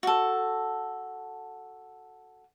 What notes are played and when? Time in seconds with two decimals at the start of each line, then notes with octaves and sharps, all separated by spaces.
0.03 F#4 A4